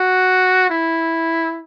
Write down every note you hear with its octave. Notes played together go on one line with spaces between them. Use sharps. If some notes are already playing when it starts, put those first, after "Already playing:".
Already playing: F#4
E4